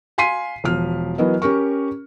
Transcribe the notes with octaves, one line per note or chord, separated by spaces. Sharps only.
F5 G#5 C6 B6 C7 D#7
E1 F3 F6
E3 F#3 B3 A#4 D#5
C#4 G4 A#4 C#6